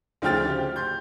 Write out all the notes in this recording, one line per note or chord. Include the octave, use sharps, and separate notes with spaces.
D2 C#3 F3 G5 F6 A6
G4
C6 G6